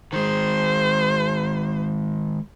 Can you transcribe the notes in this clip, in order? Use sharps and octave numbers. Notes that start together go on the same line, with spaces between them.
D#3 G#3 C5